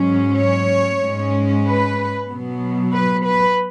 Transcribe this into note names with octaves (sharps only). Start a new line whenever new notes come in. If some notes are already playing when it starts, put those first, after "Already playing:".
Already playing: G#2 F#3 C#4
C#5
G#2 G#3 C#4
B4
B2 F#3 B3
B4
B4